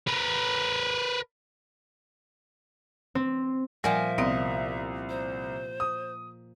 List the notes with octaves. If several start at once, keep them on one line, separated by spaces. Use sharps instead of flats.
A#4 B4
C4
A#2 F3 G3 A#3 D5 E5 F#5 G#5
C2 B3 C4 D5 D#5
C5
D#6